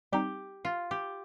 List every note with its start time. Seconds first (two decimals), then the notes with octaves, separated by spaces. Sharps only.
0.13 G3 C4 D#4 G4
0.65 F4
0.91 G4